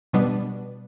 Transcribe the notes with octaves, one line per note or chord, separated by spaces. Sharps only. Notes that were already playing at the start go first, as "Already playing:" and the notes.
B2 G3 B3 D4